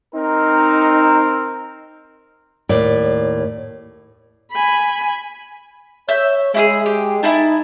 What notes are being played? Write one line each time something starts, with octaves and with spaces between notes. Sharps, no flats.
C4 D#4 A#4
D#2 A2 D5
G#5 B5
C#5 E5 G6
G#3 E4 G4 G#4
G4
D#4 E4 G#5 A5